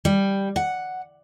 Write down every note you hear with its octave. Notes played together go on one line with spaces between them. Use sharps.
G3
F#5